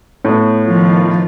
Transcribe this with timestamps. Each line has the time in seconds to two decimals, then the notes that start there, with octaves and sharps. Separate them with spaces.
0.25 A2 B3
0.64 D#3 F3 F4